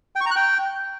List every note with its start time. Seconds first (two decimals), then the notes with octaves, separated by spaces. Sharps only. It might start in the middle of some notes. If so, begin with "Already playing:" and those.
0.16 G5
0.21 C#6
0.26 A#5
0.31 F#6
0.36 G5